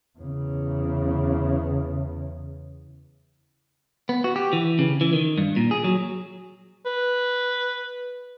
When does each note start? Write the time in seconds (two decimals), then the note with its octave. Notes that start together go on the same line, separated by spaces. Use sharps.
0.19 E2 C#3
4.09 B3
4.24 F#4
4.36 G4
4.53 E3
4.79 C#3
5.01 E3
5.13 D#3
5.38 G2
5.56 A#2
5.71 G#4
5.84 F#3
6.86 B4